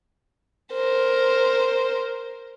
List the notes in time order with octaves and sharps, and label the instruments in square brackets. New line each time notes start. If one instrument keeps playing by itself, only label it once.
[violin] A#4 C5